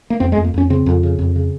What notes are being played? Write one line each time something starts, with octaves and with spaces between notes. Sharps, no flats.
A#3
F2 C4
G#3
F2
A#3
F2 C#4
C#3 C4
F2
C#3
F2
C#3